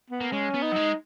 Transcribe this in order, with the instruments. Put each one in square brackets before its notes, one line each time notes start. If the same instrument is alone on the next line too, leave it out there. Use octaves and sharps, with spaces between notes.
[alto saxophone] B3
[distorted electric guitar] A#3
[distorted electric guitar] G#3 [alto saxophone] C#4
[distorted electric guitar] B3
[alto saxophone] D#4
[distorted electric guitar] F#3
G#3